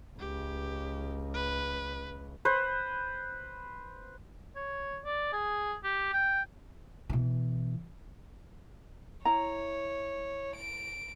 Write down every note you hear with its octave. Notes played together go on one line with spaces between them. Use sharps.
C#2 G4
B4
B4 C5
C#5
D5
G#4
G4
G5
B2 E3
E4 C#5 A#5
D7